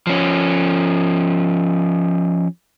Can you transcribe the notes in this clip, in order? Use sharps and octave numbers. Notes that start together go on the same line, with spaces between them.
F3 C#4